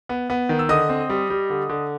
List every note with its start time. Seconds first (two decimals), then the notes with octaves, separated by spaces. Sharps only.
0.09 B3
0.30 B3
0.49 D#3
0.59 E6
0.69 D3 D#5 D#6
0.89 C4
1.09 G3
1.30 G3
1.50 D3
1.69 D3